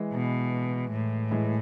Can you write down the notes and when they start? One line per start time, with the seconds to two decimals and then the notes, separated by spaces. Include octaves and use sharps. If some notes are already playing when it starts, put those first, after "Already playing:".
Already playing: E3 G#3
0.13 B2
0.92 A2
1.31 E3 G#3